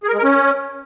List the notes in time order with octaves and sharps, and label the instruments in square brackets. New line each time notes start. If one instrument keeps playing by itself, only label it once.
[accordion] G#4
A#4
G#3
A#4
C#4